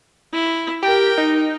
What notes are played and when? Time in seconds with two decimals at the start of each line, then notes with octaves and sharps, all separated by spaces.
0.33 E4
0.83 G4 A#4 G5
1.18 D#4